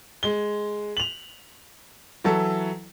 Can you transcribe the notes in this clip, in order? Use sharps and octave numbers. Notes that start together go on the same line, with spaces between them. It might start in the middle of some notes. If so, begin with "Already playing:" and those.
G#3 G7
F7 F#7
E3 F#3 E4 A4